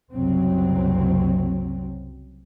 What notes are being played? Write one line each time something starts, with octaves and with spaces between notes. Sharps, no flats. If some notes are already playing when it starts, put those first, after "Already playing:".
F#1 C2 F#3 C4